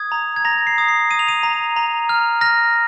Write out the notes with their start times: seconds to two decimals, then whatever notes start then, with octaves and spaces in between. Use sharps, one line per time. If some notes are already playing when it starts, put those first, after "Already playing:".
Already playing: D#6 G#6
0.12 A#5
0.36 G#6
0.45 A#5 A#6
0.67 C7
0.78 D#6
0.88 C7
1.11 D#6 D#7
1.19 F7
1.28 D#7
1.43 A#5
1.76 A#5
2.09 F6
2.41 F6 A#6